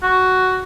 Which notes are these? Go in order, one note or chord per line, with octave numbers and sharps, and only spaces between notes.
F#4